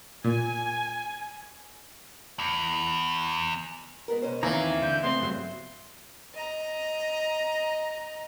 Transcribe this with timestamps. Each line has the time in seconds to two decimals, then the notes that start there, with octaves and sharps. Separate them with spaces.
0.24 A#2 G#5
2.39 E2
4.08 G#3 B3 A#4
4.22 B2 C#4 C5
4.43 D#2 D#3 E3 A#3 C4 F5 A#5
4.82 D3 G#3 G6
5.03 E2 C#3 A3 B3 C4 C6
5.21 G2 F#3
6.34 D#5 A#5